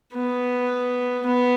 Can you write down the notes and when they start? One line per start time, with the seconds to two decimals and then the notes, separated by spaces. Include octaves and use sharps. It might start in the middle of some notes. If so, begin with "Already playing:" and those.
0.14 B3
1.26 B3